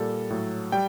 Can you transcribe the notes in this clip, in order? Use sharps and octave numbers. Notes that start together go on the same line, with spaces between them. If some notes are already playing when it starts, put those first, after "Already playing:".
Already playing: A#2 G3 A4
A2 F#3
G3 G5